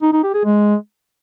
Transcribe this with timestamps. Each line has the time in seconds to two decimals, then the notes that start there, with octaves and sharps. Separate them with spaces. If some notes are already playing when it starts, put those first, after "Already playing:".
0.02 D#4
0.13 D#4
0.23 G4
0.34 G#4
0.45 G#3